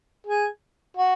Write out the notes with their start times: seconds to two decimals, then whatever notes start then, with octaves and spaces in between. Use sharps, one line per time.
0.27 G#4
0.97 F#4